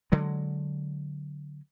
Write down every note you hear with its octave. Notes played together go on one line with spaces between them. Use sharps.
D3 F#3 G#3